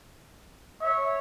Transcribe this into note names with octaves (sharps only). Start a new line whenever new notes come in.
C#5 E5